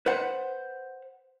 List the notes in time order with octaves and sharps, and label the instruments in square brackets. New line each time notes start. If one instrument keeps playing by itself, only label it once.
[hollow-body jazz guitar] B4 C5 F#5